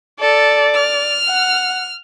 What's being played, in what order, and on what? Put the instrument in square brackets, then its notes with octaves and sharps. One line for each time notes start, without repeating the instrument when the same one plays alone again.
[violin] A4 [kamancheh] D5
[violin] F6
[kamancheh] F#5